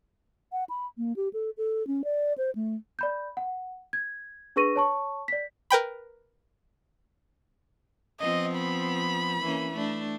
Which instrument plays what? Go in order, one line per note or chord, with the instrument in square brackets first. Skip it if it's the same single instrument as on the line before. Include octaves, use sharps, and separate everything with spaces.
[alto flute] F#5
B5
A#3
G4
A4
A4
C#4
D5
C5
A3
[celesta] D5 B5 G6
F#5
G#6
D4 G#4 B4 C#6 A#6 D#7
C#5 A5 C#6
D5 B6
[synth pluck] A#4 B4 G5 B5
[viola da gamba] F3 B3 C4 [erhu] D#5
[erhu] B5
[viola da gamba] E3 A#3 C#4
A3 D4